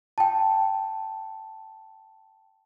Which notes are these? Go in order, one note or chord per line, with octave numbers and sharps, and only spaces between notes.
G5 A5